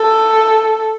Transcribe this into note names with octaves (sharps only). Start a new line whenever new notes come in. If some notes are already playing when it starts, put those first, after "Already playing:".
Already playing: A4